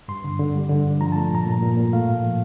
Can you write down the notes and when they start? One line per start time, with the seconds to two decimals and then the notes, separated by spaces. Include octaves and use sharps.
0.08 G2 C6
0.24 D3
0.40 D3
0.55 G3
0.70 D3
0.85 G2
1.01 F3 A#5
1.12 A5
1.16 A3
1.31 A#2 A#5
1.47 A#2
1.63 A#2
1.77 A#2
1.93 A3 F5
2.08 A2
2.23 F3